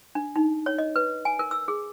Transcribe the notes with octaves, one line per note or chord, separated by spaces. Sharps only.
D4
D#4
C#5
D#5
B4
G#5
A#4
E6
G#4